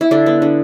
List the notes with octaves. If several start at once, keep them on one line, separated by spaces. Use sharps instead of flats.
E4
D3 D4
B3
D3